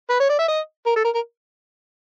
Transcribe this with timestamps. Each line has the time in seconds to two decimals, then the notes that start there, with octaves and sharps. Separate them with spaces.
0.10 B4
0.20 C#5
0.29 D5
0.39 E5
0.48 D#5
0.86 A#4
0.96 A4
1.05 A#4
1.15 A#4